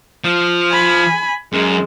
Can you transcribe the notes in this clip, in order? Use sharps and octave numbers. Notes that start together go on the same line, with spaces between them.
F3
G#5 B5
F#2 G#3